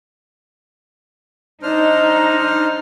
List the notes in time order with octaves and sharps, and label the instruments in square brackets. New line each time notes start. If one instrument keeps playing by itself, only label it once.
[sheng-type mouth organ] D4 C5 F6 [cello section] D#4